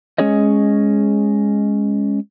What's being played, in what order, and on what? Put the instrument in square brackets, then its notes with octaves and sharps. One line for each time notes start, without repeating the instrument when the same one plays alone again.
[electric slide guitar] G#3 C#4 G#4 C#5 D#5